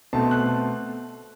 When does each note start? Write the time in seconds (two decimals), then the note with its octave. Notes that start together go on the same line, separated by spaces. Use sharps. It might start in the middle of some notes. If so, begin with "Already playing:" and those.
0.13 B2 A3 C4 A5
0.31 F#6